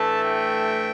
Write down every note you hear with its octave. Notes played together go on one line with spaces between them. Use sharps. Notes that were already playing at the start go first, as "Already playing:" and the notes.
Already playing: A2 E3 A3 D4 A5
G5